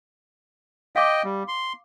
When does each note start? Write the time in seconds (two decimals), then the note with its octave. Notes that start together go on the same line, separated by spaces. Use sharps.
0.96 D#5 F5 G5 D6
1.24 G3
1.48 C6